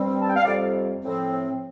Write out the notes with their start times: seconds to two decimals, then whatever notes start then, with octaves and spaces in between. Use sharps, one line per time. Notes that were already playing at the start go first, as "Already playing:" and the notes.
Already playing: G2 G3 C4
0.19 A5
0.27 G5
0.36 F5
0.45 F2 C3 G3 C4 D5
1.03 A2 F3 C4